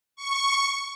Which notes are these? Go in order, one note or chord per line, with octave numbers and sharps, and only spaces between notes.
C#6